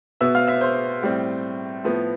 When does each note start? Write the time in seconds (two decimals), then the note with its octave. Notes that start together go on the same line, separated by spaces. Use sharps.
0.21 B2 B3 E5 E6
0.35 F5 F6
0.48 E5 E6
0.61 C5 C6
1.03 A2 G3 C4
1.84 A2 F3 B3